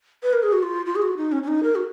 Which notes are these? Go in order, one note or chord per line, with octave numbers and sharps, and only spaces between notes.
B4
A#4
G#4
F#4
F4
F4
G#4
F#4
D#4
C#4
C#4
D#4
A#4
F#4